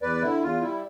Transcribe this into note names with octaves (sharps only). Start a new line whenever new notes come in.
E2 B4 D5
D3 E4
E2 F4
G3 E4